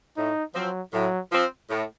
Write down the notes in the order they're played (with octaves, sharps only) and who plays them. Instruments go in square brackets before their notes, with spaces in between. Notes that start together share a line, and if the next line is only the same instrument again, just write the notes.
[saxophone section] A2 [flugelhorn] D#4
[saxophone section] F3 C4 [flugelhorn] F#3
[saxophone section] A2 [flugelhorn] F#3
[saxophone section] F3 C4
A2